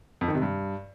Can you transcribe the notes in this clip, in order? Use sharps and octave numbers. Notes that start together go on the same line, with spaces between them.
F2
D#3
C3
G2